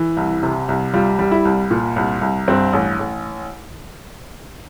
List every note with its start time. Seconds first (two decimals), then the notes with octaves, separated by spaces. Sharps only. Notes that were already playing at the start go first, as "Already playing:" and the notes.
Already playing: E3
0.17 C2
0.43 C3
0.68 C2
0.93 G3 F4
1.19 G3
1.31 E4
1.45 C2
1.71 A#2
1.96 C2
2.21 C2
2.48 G2 C4
2.73 A1
2.99 A1